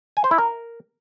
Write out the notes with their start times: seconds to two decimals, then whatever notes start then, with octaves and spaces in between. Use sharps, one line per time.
0.17 G#5
0.24 C5
0.31 E4
0.38 A#4